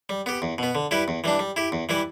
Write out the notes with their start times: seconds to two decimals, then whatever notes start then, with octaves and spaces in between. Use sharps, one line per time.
0.09 G3
0.26 B3 G4
0.42 E2
0.58 B2 B3
0.75 D3
0.91 G3 E4 G4 B4
1.08 E2
1.24 E3 G3 D4
1.39 G3
1.56 E4 G4
1.72 E2
1.89 E3 G3 E4 B4